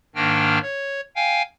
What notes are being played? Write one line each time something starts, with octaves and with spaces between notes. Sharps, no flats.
G#2 D#3 A#3 D4 G5 F6
C#5
F5 G5 G#5